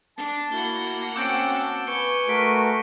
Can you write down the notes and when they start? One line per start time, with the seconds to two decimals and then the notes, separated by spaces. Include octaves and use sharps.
0.17 D4 A5
0.52 A#3 E4 F#4 F#5 G7
1.16 C4 C#4 F#4 A5 D6 E6 G6 D7
1.87 B4 G#5 C#6 C#7 G7
2.28 A3 F#4 A#4 C#6 B6 D7